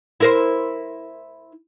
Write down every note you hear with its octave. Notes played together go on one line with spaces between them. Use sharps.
E4 A#4 C5